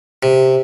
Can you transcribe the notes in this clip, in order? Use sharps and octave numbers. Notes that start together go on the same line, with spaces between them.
C3